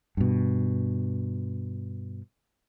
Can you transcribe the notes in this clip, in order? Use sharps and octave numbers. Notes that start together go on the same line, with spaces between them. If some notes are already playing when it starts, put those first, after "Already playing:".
G2 B2